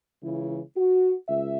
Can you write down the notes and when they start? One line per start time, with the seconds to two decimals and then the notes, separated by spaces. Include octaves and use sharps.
0.22 C#2 C#3 E3 E4
0.76 F#4
1.29 C#2 E5